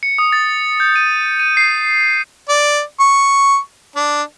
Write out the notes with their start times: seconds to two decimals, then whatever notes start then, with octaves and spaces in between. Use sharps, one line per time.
0.03 C#7
0.18 D#6
0.32 A6
0.80 G6
0.96 D#7
1.40 D#7
1.57 C7
2.49 D5
3.00 C#6
3.96 D4